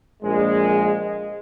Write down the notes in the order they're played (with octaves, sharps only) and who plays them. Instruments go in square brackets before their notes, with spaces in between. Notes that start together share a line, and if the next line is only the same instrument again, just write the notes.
[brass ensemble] A#1 G#3